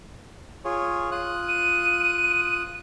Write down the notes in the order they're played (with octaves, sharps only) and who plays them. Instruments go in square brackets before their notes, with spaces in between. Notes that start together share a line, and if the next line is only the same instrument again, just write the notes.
[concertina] F4 G#4 C#5
F4 D#6 F#6
[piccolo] D#7